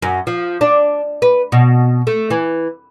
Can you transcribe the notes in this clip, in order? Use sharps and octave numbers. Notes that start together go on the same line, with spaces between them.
F#2
F3
D4
B4
B2
A3
E3